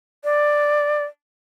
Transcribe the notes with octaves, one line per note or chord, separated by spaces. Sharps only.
D5